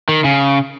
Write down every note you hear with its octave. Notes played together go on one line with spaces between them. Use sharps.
D#3
C#3